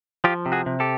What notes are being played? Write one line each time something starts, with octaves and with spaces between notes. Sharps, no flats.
F3 F4 G4
C3
F#4 G#4
C3
G4 A4